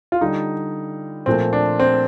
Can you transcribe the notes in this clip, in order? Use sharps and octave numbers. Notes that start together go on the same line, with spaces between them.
F4
D3 G3 D#4
A#2 F3 A3 C4
D4
C4